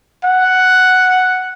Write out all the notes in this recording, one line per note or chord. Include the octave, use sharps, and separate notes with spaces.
F#5